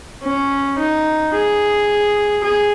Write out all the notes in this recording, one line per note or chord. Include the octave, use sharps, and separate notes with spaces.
C#4
D#4
G#4
G#4